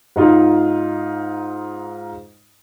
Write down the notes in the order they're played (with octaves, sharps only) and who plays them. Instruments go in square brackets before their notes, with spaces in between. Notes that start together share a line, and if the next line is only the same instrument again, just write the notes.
[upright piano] G#2 D#4 F4